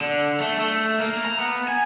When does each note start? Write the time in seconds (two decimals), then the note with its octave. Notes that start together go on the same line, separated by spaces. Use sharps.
0.01 D3
0.40 A3
0.59 A3
1.00 A#3
1.25 A#5
1.39 B3
1.68 G#5